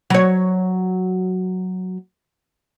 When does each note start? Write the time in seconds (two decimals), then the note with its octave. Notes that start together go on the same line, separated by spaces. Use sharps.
0.10 F#3 C#5